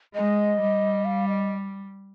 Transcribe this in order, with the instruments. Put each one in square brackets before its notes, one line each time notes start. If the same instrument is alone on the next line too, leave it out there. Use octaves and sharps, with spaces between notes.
[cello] G#3 [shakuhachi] D#5
[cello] G3
[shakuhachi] F5
D#5